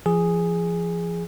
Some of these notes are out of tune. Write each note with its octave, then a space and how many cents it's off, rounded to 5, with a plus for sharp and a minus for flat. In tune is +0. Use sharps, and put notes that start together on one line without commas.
F3 -30 G#4 +0